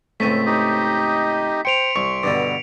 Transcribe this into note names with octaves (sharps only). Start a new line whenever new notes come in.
C#2 A2 A3 C4 B6 D#7
D#4 G4 D#5
C5 G5 C6 C#7 D7 F7
C2 C#6
G2 B2 D3 D6